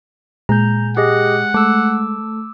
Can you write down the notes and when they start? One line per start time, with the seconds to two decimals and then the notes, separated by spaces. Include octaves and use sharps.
0.49 A#2 G#3 A#5 G6
0.97 G4 G#4 D#5 F#5
1.54 G#3 A3 D6 E6